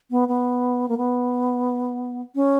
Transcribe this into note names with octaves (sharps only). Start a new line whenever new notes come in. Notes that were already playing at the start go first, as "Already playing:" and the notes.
B3
B3
A#3
B3
C#4